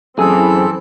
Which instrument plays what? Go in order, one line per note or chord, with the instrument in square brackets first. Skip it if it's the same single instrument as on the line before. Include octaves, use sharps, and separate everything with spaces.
[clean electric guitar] F#2 G#4 [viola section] E3 C4 [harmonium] A4